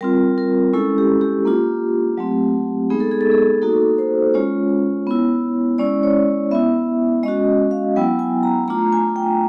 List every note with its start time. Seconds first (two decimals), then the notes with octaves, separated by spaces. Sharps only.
0.01 G3 C4 F4 A#4
0.38 A#4
0.73 G#3 C#4 E4 A4
0.98 G4
1.21 G4
1.45 A#3 D4 F4
2.18 F#3 A3 C4
2.90 G#3 B3 D#4 G#4
3.00 A4
3.11 G#4
3.21 A4
3.32 G#4
3.62 A#3 D#4 F#4 A4
3.98 C5
4.34 G#3 C#4 F4 C#5
5.07 B3 E4
5.78 G#3 C#4 E4 D5
6.03 C#5
6.51 B3 E4 E5
7.23 G#3 C#4 F#4 D#5
7.71 F5
7.96 F#3 B3 E4 G5
8.19 G#5
8.43 A#5
8.68 A3 D4 F4 A#5
8.93 G#5
9.16 G5